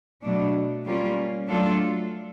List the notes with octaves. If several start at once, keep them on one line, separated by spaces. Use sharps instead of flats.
B2 F#3 A3 D4
G3 A#3 C#4 F4
F#3 A3 D4 F4 A4